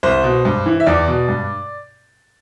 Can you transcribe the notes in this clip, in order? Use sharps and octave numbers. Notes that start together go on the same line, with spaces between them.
C2 C5
B2
G2
E3
E5
E2 D5
B2
G2